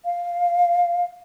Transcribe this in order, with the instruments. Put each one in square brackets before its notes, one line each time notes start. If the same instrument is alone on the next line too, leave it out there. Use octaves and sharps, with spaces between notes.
[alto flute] F5